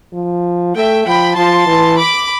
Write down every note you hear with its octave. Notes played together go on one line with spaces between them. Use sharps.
F3
A3 E5 G5
F3 G5 B5
F3 A5 C6
E3
B5 D6